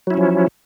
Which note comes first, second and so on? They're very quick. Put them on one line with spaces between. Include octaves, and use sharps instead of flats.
F#3 E4 C#4 F3